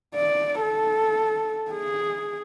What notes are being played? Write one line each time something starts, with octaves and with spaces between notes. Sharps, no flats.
D5
A4
G#4